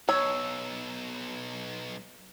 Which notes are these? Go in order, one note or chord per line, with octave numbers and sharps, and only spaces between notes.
B1 C#5 E6